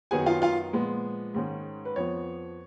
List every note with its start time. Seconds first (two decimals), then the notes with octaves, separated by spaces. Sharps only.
0.11 F#2 D#3 F#3 B3 G#4 G#5
0.26 F4 F5
0.42 F4 F5
0.73 A#2 F3 G#3 B3
1.34 G#2 D#3 G#3 C#4
1.85 B4
1.96 F2 F3 B3 C#5